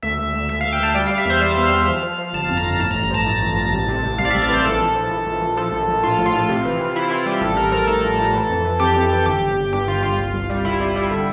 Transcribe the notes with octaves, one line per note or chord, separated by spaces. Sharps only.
D2 E5
D2
D2
D2 E5
F5
D2
G5
D2 A5
G3 G5
F5
G3
E5
E2 C5
G3 F5
E2
E2
F3
F3
F3
G1 A5
F2
A#5
G1
A2 A5
A#5
A1
A#5
F3 A5
A2
A1
A1
C2
C3
C2
C2 F5
D5
E5
C2
D5
E3 C5
A#1 A4
A#1
F3
A#1
A#1
A#1
F3 A4
A#1
A#1
A2 F4
A#1
F4
A2
C3
E3
E3
E3 E4
E3 F4
G3 G4
A1 A4
A1 A#4
F3 A#4
A2 A4
A2
A2
E3
F2
E3
F2 G4
F2
E3
G1 G4
G1
G1
G2 G4
G1 F4
G1 F4
C2
C2
G3
C2 E4
G3
G3
D3